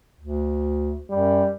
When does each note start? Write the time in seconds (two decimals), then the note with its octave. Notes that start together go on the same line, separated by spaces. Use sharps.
0.21 D2
1.10 F#2 G3